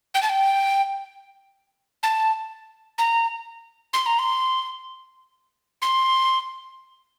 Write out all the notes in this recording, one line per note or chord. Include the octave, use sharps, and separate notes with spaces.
G5
A5
G5
A5
A#5
C6
A#5
C6
C6